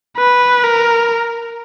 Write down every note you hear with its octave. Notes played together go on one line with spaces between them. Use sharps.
B4
A#4